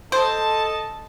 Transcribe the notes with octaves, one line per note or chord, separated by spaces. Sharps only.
A4 C5 D#5 A5